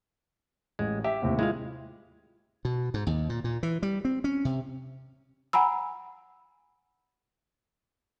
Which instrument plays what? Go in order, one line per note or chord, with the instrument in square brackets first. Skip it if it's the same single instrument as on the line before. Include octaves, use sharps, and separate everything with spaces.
[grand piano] A1 [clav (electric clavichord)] G#3
[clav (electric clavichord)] G4 [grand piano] E5
[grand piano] D#2 A2 C3
[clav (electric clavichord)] G#3 F5 [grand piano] E4 F4
[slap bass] B2
G#2
D#2
A#2
A#2
E3
G3
C4
C#4
C3
[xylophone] F#5 G#5 A#5 B5 E6